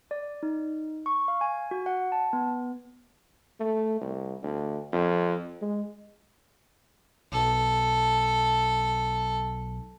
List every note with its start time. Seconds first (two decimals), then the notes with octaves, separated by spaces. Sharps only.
0.11 D5
0.43 D#4
1.06 C#6
1.28 F5
1.41 G#5
1.71 F#4
1.86 F#5
2.12 A5
2.33 B3
3.60 A3
4.01 C2
4.43 D2
4.92 F2
5.61 G#3
7.32 B1 A4